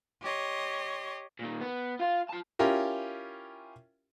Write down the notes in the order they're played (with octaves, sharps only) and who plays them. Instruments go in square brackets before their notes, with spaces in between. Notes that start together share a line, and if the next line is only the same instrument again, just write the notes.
[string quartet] G4 C#5 D#5 C6
[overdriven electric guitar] A#2 D#3
B3
F4 F5
F4 A5
[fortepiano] C#4 E4 F4 G4 A#4